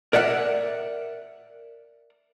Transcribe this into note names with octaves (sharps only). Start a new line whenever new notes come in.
A#4 D5 E5 F#5